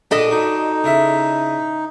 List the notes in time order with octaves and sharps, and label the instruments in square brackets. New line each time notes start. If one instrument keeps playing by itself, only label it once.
[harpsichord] A#1 B5 D#6 [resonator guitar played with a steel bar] D4 A4 D#5
[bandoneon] D#4 [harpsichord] F#4
[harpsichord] C#3 E4 E5